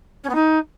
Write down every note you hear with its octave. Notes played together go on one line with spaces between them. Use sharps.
C#4
B3
D#4